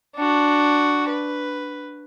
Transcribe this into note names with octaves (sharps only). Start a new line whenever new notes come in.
D4 F#4
B4